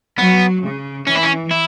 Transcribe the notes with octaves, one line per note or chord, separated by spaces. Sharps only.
F#3 B3
C#3
E3 C#4
E4
C#4
E4